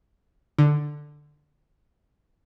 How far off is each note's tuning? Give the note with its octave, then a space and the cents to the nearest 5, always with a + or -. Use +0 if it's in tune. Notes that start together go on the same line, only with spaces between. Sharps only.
D3 +10